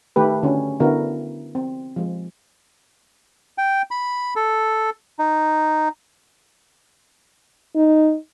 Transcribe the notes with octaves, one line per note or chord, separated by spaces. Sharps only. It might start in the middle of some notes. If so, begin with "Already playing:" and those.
D#3 A3 G4 B4
D3 C#4 F#4
D3 B3 E4 F#4 A#4
C4
F3 G#3
G5
B5
A4
D#4
D#4